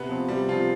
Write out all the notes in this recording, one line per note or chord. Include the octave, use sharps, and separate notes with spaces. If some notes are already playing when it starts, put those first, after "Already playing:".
Already playing: C3 B3
F3 C4
C3 G3
F3 C4 F4